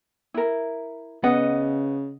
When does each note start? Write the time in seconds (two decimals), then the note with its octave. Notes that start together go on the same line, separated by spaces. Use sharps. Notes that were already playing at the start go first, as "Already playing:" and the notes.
0.34 E4 A#4
1.24 C#3 B3 D#5 F#5